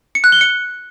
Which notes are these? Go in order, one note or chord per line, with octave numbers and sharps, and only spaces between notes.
C#7
F#6
G7
C#7